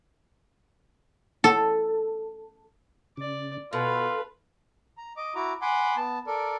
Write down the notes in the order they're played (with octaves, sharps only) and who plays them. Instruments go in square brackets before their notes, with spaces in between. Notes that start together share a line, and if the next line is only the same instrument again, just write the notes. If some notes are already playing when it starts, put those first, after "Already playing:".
[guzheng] A4
[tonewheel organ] C#3 [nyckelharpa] D5
[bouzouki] B2 [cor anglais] F4 [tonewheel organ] A4 [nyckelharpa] B4
[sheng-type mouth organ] A#5
D#5 D6
E4 F#4 A#5 D6
F#5 G#5 B5 C6 D6
B3 A5
A4 A#4 D5